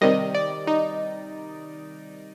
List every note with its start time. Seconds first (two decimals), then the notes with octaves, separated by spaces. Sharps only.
0.01 C3 D#3 G3 D#5
0.35 D5
0.67 D#4